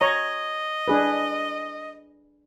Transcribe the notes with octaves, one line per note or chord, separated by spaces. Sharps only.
C#5 D#5 A#5
D4 G#4 B4